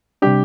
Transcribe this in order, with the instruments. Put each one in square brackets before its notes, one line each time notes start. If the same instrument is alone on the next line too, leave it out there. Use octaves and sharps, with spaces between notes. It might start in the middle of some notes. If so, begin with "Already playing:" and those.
[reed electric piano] C3 G3 D4 [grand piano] G4